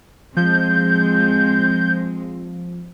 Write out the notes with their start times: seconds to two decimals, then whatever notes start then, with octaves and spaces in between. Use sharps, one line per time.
0.37 F3 G#3 C4 G6